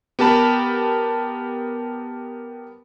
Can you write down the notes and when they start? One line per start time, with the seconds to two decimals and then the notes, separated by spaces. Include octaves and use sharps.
0.19 B3 G4 A#4 A5 B5